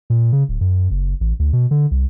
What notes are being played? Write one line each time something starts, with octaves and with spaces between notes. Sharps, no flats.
A#2
C#3
D1
F#2
F#1
A1
D2
B2
D3
C2